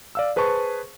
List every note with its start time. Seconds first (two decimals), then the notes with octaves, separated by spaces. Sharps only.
0.15 D5 F5 E6
0.36 G#4 B4 C5 A5 C#6